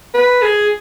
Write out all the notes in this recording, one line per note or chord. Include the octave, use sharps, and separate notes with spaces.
B4
G#4